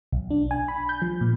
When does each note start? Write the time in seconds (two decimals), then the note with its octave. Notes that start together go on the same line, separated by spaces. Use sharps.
0.12 B1
0.31 D4
0.51 G#5
0.68 B5
0.89 G6
1.02 F3
1.21 A#2